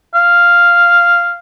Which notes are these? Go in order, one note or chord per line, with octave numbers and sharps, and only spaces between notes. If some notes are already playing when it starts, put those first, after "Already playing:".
F5